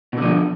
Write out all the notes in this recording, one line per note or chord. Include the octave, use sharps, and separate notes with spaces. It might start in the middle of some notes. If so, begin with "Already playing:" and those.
B2 D3 F3